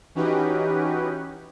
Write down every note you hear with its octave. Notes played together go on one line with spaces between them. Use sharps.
E3 C#4 D#4 F#4 G4 B4